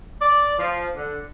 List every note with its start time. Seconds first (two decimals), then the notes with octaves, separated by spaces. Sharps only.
0.22 D5
0.59 F3
0.95 D3